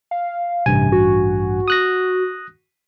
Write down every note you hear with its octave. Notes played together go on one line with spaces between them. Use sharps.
F5
A1 G2 C3 G#5
F#4
D#6 F#6 A#6